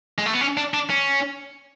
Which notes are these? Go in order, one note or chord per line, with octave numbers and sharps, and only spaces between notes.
G#3
A3
B3
C#4
D4
D4
C#4